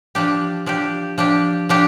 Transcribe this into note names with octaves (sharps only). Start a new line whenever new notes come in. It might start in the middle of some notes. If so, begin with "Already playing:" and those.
F3 D4 G4
F3 D4 G4
F3 D4 G4
F3 D4 G4